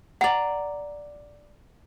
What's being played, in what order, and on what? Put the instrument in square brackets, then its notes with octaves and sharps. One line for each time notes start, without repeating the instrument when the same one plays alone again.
[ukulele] D5 A#5 [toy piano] F#5